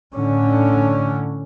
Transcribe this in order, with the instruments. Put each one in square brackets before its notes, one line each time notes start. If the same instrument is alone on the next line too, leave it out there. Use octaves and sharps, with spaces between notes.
[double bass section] A2 D3 C#4